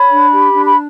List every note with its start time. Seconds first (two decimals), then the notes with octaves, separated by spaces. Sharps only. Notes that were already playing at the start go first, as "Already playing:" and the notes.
Already playing: C#5 B5
0.10 D4
0.32 G4
0.53 D4
0.66 B5